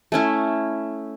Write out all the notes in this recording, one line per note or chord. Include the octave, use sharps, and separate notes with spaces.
A3 C#4 E4